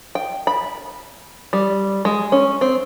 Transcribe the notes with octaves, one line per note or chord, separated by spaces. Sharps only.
G5
B5
G3
G#3
C#4
C4